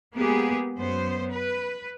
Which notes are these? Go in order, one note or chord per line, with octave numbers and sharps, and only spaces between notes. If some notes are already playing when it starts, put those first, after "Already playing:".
G#3 A#3 B3 G4 G#4
F#2 B3 C5
B4